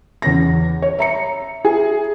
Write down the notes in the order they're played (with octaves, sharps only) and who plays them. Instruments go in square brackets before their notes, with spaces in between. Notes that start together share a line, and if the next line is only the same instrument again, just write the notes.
[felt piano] E2 C#4 A#6
C#5
E5 A#5 C#7
[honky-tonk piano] G#4